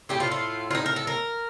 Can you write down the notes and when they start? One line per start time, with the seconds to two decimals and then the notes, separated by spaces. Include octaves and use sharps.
0.09 A2 A3 G4
0.20 F4
0.31 F4
0.71 F4
0.75 D#4
0.86 A#4
0.96 A4
1.07 A#4